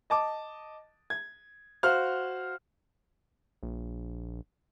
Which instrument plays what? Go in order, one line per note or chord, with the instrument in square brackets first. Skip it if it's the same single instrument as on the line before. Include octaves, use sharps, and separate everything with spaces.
[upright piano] D#5 A5 D6
G#6
F#4 C5 F5 F6
[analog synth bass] A#1